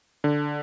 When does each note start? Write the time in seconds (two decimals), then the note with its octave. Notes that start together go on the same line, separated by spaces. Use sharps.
0.24 D3